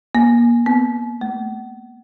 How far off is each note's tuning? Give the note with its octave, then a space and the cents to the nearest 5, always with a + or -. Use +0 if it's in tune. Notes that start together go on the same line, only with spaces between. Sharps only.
A#3 +30
B3 +40
A3 -15